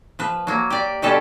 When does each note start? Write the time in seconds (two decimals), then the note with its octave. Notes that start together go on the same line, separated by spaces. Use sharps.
0.19 F3 B4
0.47 F#3 A#3
0.70 G4 D5
1.02 B2 D3 G3 C#4 G4 A4